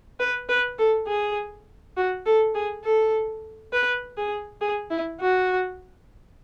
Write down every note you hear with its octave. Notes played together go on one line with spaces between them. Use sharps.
B4
B4
A4
G#4
F#4
A4
G#4
A4
B4
G#4
G#4
E4
F#4